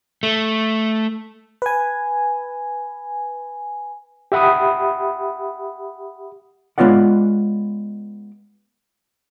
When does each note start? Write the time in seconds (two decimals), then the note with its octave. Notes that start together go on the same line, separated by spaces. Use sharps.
0.23 A3
1.62 B4 G#5
4.32 G4 E5 F#5 B5 D#6
6.78 G#3 B3 F4 C#5 D5 F#5